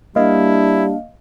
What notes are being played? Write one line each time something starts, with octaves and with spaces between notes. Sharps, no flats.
G3 A#3 D4 E4 D#5 F5